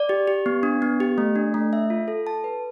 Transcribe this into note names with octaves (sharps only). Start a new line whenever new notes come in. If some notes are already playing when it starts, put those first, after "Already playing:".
Already playing: D5
G4
G4
B3
D4
B3
G4
A3
D4
A3
E5
F4
A4
A5
B4